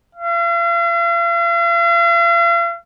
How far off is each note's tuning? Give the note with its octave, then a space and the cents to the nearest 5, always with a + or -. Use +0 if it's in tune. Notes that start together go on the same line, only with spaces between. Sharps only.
F5 -45